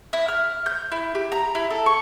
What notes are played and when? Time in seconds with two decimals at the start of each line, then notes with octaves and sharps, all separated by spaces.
0.13 E4
0.28 F6
0.66 G6
0.92 E4
1.15 G4
1.32 A#5
1.55 E4
1.70 A4
1.86 C#6